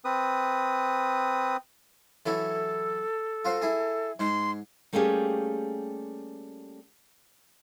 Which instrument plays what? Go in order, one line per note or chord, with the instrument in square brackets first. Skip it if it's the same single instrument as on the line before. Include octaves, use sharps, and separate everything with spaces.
[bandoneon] C4 B4 D#6
[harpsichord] E3 F#3 E4 [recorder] A4
[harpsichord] F4 F#4 C5
E4 G#4
[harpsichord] G#2 [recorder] C6
[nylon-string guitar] G3 A3 A#3 C#4 G4 G#4